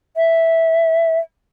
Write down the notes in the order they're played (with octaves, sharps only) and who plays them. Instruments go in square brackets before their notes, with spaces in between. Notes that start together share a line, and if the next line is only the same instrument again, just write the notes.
[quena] E5